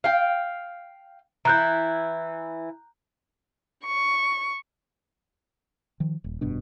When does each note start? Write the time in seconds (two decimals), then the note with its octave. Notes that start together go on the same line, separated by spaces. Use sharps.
0.04 F5 G5
1.45 E3 E4 A#5 F#6 G6
3.87 C#6
6.00 D#3 F3
6.24 D#1
6.41 F1 G2 B2 D4